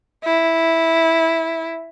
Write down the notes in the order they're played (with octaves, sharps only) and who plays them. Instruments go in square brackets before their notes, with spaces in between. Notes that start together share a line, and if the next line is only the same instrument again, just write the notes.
[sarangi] E4